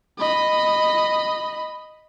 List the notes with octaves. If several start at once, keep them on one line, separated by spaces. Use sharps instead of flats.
D#5 B5